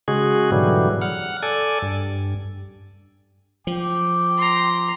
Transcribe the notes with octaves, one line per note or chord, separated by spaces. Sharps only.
C#3 G#3 F#4 G#4
G#2 B2 D3 E3 F#3 G3
F#5 F6
A4 D5 G#5
G2
F3 G5 D6
A#5 C6